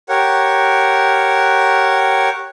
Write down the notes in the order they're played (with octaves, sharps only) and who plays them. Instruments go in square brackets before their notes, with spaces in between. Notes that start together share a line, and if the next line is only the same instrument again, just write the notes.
[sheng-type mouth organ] G4 A#4 C#5 F#5